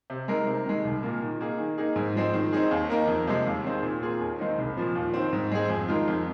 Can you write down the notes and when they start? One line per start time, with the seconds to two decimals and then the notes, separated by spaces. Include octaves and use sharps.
0.10 C3
0.28 G#3 D#4 A#4
0.47 C3
0.66 D#3 G#3
0.85 C2
1.03 A#2 A#3
1.22 D#3
1.41 A#3 D#4 G#4
1.59 D#3
1.78 A#3 D#4 G#4
1.96 G#2
2.15 F3 G#3 C4
2.34 D#3
2.53 C4 D#4 G#4
2.71 D#2
2.90 D#3 A#3 D#4 A#4
3.08 F2
3.27 C3 G#3
3.46 D#2
3.65 D#3 C4 G#4
3.83 A#2
4.02 A#3 F4 G#4
4.20 D#2
4.39 D#3 G#3 C4 D#4
4.58 C2
4.77 A#2 F3
4.95 D#2
5.14 D#3 C4
5.33 G#2
5.51 G#3 C4 G#4
5.69 F2
5.88 D#3 G#3 F4 A#4
6.08 F2